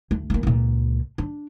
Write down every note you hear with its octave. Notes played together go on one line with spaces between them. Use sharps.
D2
E3 A#3
C#2 A#2
D4